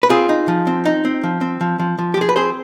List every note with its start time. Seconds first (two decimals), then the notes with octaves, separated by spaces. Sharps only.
0.03 B4
0.09 C4 F4 G#4
0.29 D#4
0.48 F3
0.67 C4
0.85 D#4
1.05 C4
1.24 F3
1.41 C4
1.61 F3
1.79 F3
1.99 F3
2.14 G4
2.17 F3 G#4
2.29 B4
2.36 C4 G#4 C5